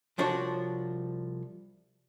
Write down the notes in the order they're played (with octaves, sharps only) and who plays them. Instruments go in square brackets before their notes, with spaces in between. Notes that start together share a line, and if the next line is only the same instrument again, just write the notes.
[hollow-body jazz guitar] C2 F3 D4 F#4 C#5